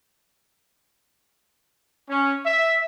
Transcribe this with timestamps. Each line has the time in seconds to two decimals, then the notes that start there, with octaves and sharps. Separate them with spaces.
2.10 C#4
2.46 E5